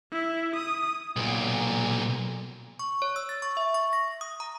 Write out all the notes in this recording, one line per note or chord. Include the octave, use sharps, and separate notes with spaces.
E4
D#6
B1 A#2
C#6
C#5
E6
A6
C#6
E5
C#6
A#6
D#6
A#5